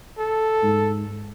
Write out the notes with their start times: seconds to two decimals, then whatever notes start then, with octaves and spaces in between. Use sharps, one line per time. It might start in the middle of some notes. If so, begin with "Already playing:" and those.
0.19 A4
0.63 G#2